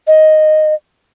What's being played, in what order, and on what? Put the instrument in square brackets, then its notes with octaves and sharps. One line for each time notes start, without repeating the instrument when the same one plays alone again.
[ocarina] D#5